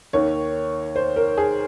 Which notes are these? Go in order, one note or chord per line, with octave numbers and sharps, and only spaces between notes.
D#2 D#3 C#5
C5
A#4
G#4